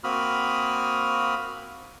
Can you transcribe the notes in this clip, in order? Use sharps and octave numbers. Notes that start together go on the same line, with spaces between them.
A#3 C4 F#4 B5 D#6 F6